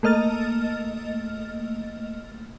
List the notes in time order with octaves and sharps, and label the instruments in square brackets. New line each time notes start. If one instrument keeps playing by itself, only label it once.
[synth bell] A3 A#3 D#5 F6 A6